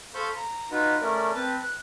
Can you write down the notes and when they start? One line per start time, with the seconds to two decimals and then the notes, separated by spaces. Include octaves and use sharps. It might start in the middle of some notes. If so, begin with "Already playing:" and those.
0.15 A4 C5 F5 B5 C#6 G6
0.37 A#5
0.71 D#4 F4 F#4 B4
1.01 A3 C#4 A#4 D5
1.35 C4 B4 A5
1.62 F#6